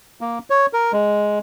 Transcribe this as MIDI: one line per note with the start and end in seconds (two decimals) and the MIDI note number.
0.21 0.39 58
0.50 0.66 73
0.73 0.92 70
0.93 1.39 56